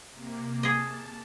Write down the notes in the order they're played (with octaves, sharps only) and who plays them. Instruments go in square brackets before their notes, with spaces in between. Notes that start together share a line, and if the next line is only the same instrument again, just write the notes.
[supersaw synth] C3 A#3
[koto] G#4 D#5 [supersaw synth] A5